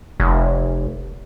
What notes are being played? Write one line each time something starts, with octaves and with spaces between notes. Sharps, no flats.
F1